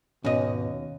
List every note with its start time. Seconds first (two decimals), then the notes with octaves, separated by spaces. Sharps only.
0.25 D#2 G#2 B2 C#4 D#5